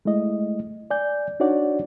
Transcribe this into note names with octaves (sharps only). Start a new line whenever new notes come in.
G#3 A3 E4 D#5
D5 G#5 G6
D4 D#4 F#4 C#5 D5 F#5